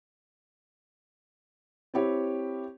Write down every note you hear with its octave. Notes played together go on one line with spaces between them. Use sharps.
C4 E4 G4 C#5